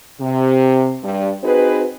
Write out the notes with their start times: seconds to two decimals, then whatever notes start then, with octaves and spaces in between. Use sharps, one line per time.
0.19 C3
1.03 G2
1.43 C4 D#4 F#4 G#4 B4